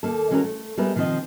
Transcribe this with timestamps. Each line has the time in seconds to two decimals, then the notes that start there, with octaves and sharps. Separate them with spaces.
0.03 D#2 A#3 A4
0.31 E3 G#3 C#4 F#4 G4 A#4
0.44 A3
0.77 G3 G#3 B3 A#4 B4 E5
0.95 B2 D#3 F3 C4 C5 D#5